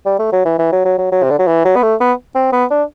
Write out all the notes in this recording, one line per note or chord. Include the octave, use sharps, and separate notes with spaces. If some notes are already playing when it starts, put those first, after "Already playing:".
G3
A3
F#3
E3
E3
F#3
F#3
F#3
F#3
C3
D3
F#3
E3
F#3
B3
A3
B3
C4
B3
D4